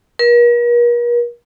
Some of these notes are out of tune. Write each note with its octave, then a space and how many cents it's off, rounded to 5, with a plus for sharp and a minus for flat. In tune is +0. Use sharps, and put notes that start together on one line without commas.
A#4 +45